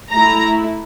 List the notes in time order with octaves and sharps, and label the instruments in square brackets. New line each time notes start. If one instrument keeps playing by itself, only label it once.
[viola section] A3 E4 A#5